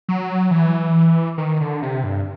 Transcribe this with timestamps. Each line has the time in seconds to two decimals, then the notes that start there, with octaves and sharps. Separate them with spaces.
0.09 F#3
0.51 E3
1.38 D#3
1.61 D3
1.82 C3
2.04 G2